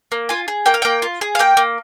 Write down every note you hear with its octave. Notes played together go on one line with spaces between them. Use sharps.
A#3
F4 G#5
G#4
A#3 G5
F5
A#3 G5
F4
G#4
F5
A#3 G5
A#3